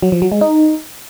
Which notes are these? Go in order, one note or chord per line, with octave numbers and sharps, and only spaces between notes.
F#3
F3
F#3
G#3
D#4